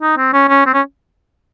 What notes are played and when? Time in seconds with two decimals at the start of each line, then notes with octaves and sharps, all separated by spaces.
0.01 D#4
0.18 C4
0.33 C#4
0.49 C#4
0.66 C4
0.74 C#4